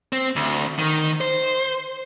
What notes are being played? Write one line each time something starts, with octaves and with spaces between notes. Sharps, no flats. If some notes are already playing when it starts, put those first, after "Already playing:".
C4
D2
D#3
C5